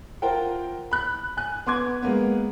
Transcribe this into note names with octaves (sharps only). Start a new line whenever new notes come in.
F4 A#4 C5 F#5 G5
B5 F#6
G#5 F#6
B3 C6 D6 G#6
G#3 A#3 B3